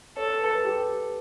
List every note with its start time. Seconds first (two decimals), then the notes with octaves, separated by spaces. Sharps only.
0.17 A4 C#5
0.38 B4
0.49 B4
0.65 G4